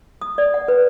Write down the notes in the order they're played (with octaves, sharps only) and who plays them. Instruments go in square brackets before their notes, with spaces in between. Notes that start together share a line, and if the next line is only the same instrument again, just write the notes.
[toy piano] D#6
D5
F#5
B4